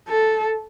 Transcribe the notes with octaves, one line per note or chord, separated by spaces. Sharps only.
A4